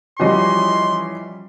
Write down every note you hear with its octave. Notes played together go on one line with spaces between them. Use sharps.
E3 F3 G3 C#4 F#4 D#5 C6